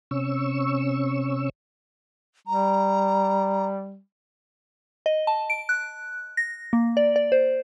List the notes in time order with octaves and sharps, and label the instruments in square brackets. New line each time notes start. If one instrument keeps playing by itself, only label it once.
[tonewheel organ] C3 C#4 C#6 E6
[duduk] G3 [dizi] A#5
[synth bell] D#5
A5
D7
F#6
A#6
A#3
D5
D5
C5